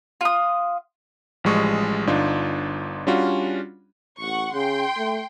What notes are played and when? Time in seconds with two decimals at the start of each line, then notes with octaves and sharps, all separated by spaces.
0.21 F4 D#6
1.44 A1 F3 G3 G#3 C#6 D#6
2.07 G1 D4 D#4 F4
3.07 G3 C#4 D4 F4 F#4
4.19 A1 F#5 C#6
4.53 C#3 G5 C6
4.97 A3